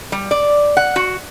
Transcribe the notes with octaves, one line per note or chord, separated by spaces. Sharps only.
G3
D5
F#5
F#4